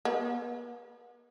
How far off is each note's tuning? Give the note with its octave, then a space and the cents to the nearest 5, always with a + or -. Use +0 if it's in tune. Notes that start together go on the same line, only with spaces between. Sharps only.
B3 -40